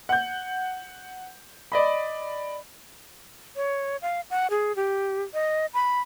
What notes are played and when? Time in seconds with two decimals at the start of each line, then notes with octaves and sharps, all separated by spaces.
0.09 F#5 G6
1.72 D5 D#5 B5
3.56 C#5
4.02 F5
4.30 F#5
4.50 G#4
4.76 G4
5.34 D#5
5.74 B5